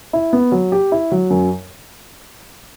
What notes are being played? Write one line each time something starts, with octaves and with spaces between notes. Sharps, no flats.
E4
B3
F#3
G4
E4
F#3
F#2